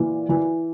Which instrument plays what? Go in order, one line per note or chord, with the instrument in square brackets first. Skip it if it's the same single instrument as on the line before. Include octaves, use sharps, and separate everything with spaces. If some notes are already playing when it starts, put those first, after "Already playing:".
Already playing: [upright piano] A#2 E3
E3